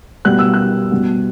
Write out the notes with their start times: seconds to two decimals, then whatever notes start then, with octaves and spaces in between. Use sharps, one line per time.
0.25 B2 G3 B3 F#6
0.39 E6
0.54 F#6
0.91 B2 G3 B3